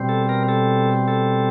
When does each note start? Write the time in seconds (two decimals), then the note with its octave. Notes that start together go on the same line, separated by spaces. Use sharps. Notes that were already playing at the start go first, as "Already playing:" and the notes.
Already playing: B2 G3 C4
0.09 A4
0.29 A#4
0.49 A4
1.08 A4